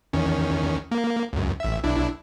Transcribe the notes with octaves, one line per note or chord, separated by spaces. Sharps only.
E2 D#3 C#4
A#3
C#2 F#2
A1 E5
B1 D4 E4